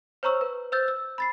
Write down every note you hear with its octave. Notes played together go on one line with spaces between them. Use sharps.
C5 C#5 A#5 C#6 E6
B4
C5 E6 G6 A6
E6
B5 A6 C7